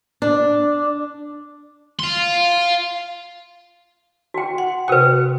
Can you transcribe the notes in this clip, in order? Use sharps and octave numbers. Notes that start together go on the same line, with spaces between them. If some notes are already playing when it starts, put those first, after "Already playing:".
D4
F5 C6
F#4 G5
F#5
C3 F#4 B4 G5